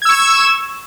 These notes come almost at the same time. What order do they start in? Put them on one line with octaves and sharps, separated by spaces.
G#6 E6 C#6 E7